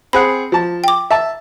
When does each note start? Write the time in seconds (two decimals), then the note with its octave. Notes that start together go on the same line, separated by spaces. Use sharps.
0.13 C4 G#4 F#5 B5
0.52 F3 A5
0.84 G5 D6
1.11 E5 A5